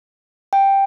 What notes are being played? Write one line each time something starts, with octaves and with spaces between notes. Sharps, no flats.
G5